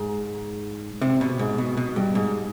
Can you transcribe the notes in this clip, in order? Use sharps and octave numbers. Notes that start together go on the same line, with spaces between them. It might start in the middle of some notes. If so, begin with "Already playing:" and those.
Already playing: G#2
C3
B2
G#2
B2
B2
G2
G#2